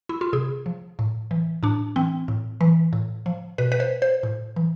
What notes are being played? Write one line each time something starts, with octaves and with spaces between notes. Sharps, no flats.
E4
F4
C3 G#4
F3
A2
E3
A2 D4
E3 C4
A2
E3
A2
F3
B2 B4
B4
C5
C5
A2
E3